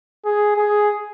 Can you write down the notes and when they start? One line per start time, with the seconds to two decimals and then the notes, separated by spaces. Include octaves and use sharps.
0.25 G#4
0.56 G#4